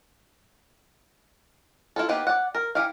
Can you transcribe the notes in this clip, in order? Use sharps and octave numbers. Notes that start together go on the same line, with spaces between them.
E4 F4 A4
A#3 B3 D#4 G4 B4
D5 F#5
A#4
E3 E4 G4 F5